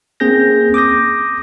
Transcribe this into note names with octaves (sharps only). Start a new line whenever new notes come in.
A#3 C4 C#4 G#4 G6 A#6
D6 D#6 G6 A#6